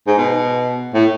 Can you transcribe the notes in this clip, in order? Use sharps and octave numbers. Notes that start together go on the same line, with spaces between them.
G#2
B2
A2